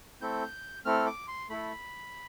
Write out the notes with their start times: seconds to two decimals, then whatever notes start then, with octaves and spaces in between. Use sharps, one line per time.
0.21 A3 C4 E4 A4 G6
0.85 A3 C4 E4 A4 F6
1.07 D6
1.28 C6
1.49 A3 E4 A4 B5